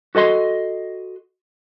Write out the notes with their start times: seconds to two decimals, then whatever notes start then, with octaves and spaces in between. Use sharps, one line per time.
0.15 F#4 A4 D#5 C6